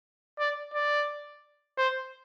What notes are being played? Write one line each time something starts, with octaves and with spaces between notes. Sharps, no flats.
D5
D5
C5